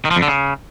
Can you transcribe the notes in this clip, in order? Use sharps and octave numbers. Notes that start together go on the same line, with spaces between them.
D#3
F3
F2
D3
C#3